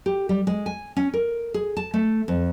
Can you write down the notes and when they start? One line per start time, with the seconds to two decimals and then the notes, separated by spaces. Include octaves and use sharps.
0.06 G4
0.29 G3
0.47 G#3
0.66 G#5
0.97 C#4
1.14 A#4
1.54 G#4
1.77 A5
1.94 A3
2.28 F2